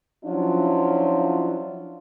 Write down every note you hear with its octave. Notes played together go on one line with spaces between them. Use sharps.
F3 F#3 C#4 D4 E4 F4